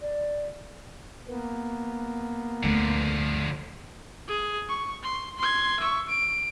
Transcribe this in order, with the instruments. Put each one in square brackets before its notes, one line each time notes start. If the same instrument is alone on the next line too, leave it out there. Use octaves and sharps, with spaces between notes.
[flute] D5
[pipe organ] A#3 B3
[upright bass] D2 A3 [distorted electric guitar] D3 F3
[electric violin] G#4
C#6
C6
C6 G#6
E5 C#6
D7